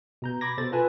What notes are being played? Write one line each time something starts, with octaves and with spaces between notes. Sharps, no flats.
B2 A#5 G6
B5 D6 G#6 A#6
B2 A4 C5 A6
F4 A4 B4 G#5 A5